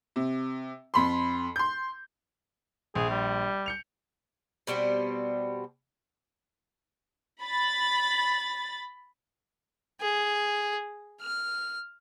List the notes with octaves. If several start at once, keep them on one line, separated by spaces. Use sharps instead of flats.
C3
F2 B5 C6
C6 G6
A#1 G#4
G3
G6 C#7 F7
B2 G3 B3 C4
B5 A6
G#4
F6